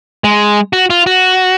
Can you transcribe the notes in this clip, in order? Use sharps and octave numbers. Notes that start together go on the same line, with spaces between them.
G#3
F#4
F4
F#4